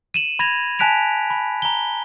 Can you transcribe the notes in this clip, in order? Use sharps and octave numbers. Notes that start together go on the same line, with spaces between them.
D#7 E7 F#7
B5 G#6 A#6 F7
G#5 A5 F#6 B6 D7 F7
B5
A#5 G7